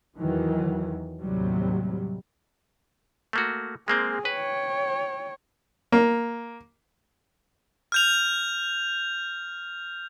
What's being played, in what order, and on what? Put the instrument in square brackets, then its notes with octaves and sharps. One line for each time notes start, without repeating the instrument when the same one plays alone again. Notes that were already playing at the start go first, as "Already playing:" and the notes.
[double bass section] E2 D#3 E3 F#3
D#2 A2 C3 F#3 G3
[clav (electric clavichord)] A3 A#3 F#4
[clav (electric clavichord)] G#3 A#3 C4 [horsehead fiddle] G#4
[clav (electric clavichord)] B4 [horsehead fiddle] C#5 G5
[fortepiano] A#3
[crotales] F6 G6 F7